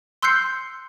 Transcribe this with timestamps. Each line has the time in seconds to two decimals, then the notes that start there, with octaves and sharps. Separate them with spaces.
0.22 C6 E6 F#6 G6 C7 C#7